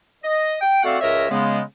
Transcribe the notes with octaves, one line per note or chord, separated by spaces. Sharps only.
D#5
G5
A3 C4 F#4 D5 F5 F#5
C#2 A#4 C#5 D#5 E5
C#3 G#3 B3